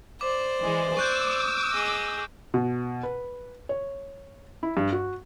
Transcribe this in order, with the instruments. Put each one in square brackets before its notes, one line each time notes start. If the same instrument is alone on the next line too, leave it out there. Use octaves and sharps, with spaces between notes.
[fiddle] C5 D5 [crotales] D6
[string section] E3 G#3
[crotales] C#6 F#6 G6 [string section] D6 E6
[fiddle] G#4 D#5
[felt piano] B2
B4
C#5
E4
G2
F#4